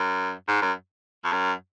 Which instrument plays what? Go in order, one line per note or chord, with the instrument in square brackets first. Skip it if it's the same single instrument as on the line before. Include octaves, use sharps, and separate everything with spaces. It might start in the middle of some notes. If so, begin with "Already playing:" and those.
Already playing: [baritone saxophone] F#2
G#2
F#2
F2
F#2